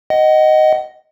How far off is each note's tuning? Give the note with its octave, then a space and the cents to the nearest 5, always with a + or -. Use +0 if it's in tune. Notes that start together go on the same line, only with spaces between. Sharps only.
D#5 +0 F#5 +30